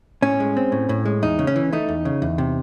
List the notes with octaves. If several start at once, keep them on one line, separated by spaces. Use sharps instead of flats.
A2 C#4
G#3
C4
A2
A2
G#3
E2 D#4
C#3
C#4
E3
A3 D#4
E2
C#3
E2
C3